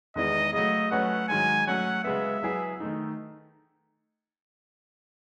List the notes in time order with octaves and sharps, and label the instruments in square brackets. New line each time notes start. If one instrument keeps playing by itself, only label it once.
[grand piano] E2 D#3 G#3 B3 E4 [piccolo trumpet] D#5
[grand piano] C#3 F#3 A3 [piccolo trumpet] D#5
[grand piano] F#3 A3 C#4 F#4 B4 [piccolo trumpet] F#5
[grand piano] G#2 D#3 F#3 [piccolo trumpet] G#5
[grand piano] F#3 A3 C#4 F#4 [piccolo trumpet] F#5
[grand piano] C#3 G#3 B3 [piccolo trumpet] E5
[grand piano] F#3 B3 E4 G#4
D#3 A3 D#4